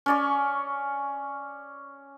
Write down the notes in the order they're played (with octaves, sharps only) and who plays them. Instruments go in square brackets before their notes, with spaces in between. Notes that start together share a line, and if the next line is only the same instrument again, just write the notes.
[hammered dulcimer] C#4 D5 C#6